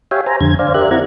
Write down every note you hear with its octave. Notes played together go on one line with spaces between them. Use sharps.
G4 C#5 E5 F5 G5 G#5
C5 G#5 A#5
F2 D3 G#6
C5 D5 F5
G4 A#4 D5 E5 F#6
C4 E4 F#5 A#5 G#6